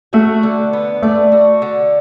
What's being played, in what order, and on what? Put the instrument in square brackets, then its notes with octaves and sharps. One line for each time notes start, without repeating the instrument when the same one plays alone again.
[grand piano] A3 [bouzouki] F#4
[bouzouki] D3
B3
[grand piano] A3 [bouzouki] D5
[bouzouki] F#4
D3